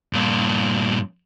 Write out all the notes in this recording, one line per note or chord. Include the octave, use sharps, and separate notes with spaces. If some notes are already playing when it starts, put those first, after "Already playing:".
G2 A#2